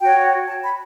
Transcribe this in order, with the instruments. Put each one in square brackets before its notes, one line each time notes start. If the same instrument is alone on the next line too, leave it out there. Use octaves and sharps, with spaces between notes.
[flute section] F#4 C#5 G5
A5
B5